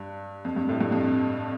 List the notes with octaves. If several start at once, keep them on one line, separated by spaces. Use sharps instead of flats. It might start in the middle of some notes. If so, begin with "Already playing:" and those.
Already playing: G2
F2
G2
A2
G2
F2